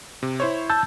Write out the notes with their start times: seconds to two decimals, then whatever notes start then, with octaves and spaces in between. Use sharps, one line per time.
0.23 C3
0.40 E4 C5 C#5
0.70 A5 E6 G6 A6